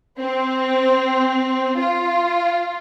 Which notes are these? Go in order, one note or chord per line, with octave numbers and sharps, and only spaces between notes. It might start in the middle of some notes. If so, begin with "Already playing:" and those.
C4
F4